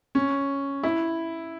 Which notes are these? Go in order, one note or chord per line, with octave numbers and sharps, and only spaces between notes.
C#4
E4